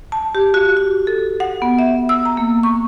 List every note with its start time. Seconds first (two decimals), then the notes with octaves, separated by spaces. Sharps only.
0.12 A5
0.35 G4
0.54 F#4
0.77 F#4
1.07 A4
1.40 F#5
1.62 B3
1.79 E5
2.09 E6
2.26 A#5
2.37 A#3
2.63 C#6